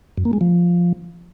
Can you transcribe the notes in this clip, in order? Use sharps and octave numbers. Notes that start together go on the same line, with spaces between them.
F#2
A#3
G#3
F3